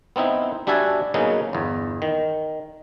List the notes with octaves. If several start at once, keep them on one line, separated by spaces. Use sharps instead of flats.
B3 C4 D#4 E4
G3 D4 F#4 E5 G#5 A5
C#3 F#3 A#3 B3 C#4 D#4
G1 E2
D#3